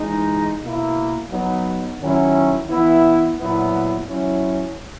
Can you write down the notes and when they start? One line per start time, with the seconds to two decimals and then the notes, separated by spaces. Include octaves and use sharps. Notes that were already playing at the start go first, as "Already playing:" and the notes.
Already playing: E3 G#3 D#4
0.61 B2 A#3 E4
1.30 F#3 B3 D#4
2.00 D#3 F#3 C#4 E4
2.70 E3 B3 E4
3.38 A#2 F#3 B3 E4
4.08 F#3 C#4 E4